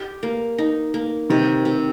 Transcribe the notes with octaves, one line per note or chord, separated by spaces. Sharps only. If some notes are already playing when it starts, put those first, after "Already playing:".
Already playing: G4
A#3
D#4
A#3
C3 D#3
C3